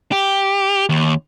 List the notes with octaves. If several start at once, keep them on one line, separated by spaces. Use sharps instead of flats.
G4
D#2